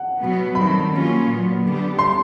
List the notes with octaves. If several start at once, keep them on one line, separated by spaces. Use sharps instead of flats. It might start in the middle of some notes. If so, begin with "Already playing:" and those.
Already playing: F#5
B2 F#3 B3
D#3 G3 C4 B5
F#3 A#3 C#4 F4
A#2 F#3 B3
D3 G3 B3 D4 G4
C6